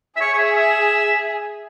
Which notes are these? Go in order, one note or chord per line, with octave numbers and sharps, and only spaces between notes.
E5
G#4 C#5
C#5
E5
E5